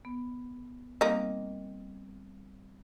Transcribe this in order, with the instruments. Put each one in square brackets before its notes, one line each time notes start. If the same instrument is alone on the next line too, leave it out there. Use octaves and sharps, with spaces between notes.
[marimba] B3
[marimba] G3 C4 [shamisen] A#3 D#4